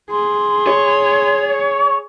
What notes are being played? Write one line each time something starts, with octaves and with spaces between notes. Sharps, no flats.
G#4 C6
C#5